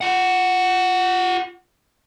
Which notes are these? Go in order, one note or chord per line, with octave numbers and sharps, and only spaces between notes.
F4 F#5